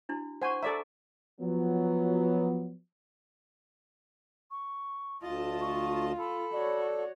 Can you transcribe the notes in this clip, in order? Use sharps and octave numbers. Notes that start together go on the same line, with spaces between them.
D4 E4 F#4
C5 F#5 G#5 C#6
A4 D5 E5 A#5
F3 F#3 B3
C#6
D2 F4 D#5 A5
C#6
A4 B5
F#4 C#5 D5